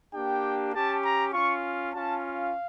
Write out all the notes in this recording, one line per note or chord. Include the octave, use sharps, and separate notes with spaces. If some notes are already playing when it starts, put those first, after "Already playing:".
A#3 D4 G4 G5
C#4 G4 A5
A#5
C#4 F4 C#6
C#4 F4 A5
F5